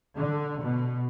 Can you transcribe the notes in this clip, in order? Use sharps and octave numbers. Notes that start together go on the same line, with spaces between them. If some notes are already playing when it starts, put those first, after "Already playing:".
D3
B2